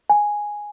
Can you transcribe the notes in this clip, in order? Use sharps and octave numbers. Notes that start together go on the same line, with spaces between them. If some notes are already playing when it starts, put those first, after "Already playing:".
G#5